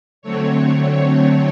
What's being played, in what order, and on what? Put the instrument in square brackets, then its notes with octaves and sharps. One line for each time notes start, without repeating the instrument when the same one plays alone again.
[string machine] D3 F#3 A3 C4 C#5